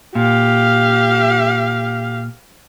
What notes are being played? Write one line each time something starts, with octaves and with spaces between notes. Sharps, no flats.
A#2 G4 F5